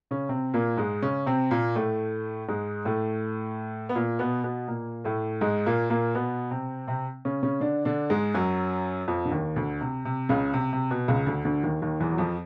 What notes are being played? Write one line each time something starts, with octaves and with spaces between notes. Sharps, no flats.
C#3 C#4
C3 C4
A#2 A#3
G#2 G#3
C#3 C#4
C3 C4
A#2 A#3
A2 A3
G#2 G#3
A2 A3
B3
A#2 A#3
B2 B3
B2 B3
A#2 A#3
A2 A3
G#2 G#3
A#2 A#3
A#2 A#3
B2 B3
C3 C4
C3 C4
C#3 C#4
C#3 C#4
D3 D4
D3 D4
G#2 G#3
F#2 F#3
F2 F3
D3
D#2 D#3
D2 D3
C3
C3
C#2 C#3
C3
C3
B2
C#2 C#3
D2 D3
D2 D3
D#2 D#3
D#2 D#3
E2 E3
F#3
F2 F3